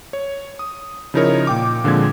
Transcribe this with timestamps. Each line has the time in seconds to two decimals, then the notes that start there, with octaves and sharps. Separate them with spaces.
0.13 C#5
0.59 D#6
1.14 C#3 F3 D#4 E4 A#4 C#5
1.47 A#2 G5 D6
1.84 A#2 D3 F3 G#3 C4 G#6